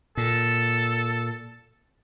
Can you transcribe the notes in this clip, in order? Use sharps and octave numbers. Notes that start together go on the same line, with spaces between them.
A#2 A4